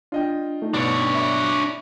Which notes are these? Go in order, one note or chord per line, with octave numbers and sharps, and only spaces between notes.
D4 F4 D#5 G5
A3 D#4
G2 B2 D4 C#5
E5 B5 D6